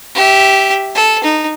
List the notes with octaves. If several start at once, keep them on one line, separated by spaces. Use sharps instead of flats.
G4 E5
A4
D#4